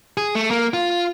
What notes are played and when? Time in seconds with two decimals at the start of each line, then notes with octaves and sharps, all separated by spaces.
0.17 G#4
0.35 A3
0.51 A#3
0.74 F4